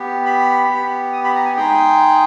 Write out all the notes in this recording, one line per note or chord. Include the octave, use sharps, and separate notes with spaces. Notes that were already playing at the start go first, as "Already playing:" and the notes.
Already playing: B3 G4
B5
B3 G4
D#6
B5
A#5
G#5
G#3 D#4 G#4 G5